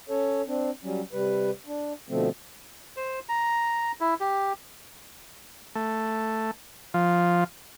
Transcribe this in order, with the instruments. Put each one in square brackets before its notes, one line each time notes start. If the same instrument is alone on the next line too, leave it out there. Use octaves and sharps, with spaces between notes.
[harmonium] C#4 A4 C#5
C4 D4
F#3 G3 C#4
C3 G3 B4
D4
B2 D3 F3 A3 C4
[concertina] C5
A#5
E4
G4
[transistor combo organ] A3
F3